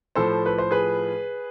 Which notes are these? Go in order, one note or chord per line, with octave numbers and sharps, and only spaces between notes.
A2 F3 A4 C5
B4
C5
G#4 B4